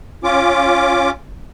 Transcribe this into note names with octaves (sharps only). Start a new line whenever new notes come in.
C#4 F4 D6